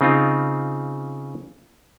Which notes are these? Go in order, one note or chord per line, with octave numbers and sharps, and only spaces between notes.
C#3 C4 D#4 F4